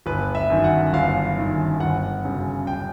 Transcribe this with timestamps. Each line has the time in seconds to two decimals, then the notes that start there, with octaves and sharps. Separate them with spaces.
0.06 G1 B4
0.35 E5
0.50 F#2 D#3
0.64 F#5
0.93 G1 F5
1.37 F#2 D#3
1.80 G1 F#5
2.24 F#2 C#3
2.67 G5